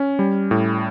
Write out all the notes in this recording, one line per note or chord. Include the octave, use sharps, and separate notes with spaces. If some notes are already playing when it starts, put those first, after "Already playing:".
Already playing: C#4
G3
A2